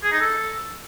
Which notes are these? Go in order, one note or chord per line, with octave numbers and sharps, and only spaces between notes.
G#4
D#4
A4